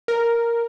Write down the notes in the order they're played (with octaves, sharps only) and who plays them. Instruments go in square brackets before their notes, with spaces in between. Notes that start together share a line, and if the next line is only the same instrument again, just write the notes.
[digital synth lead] A#4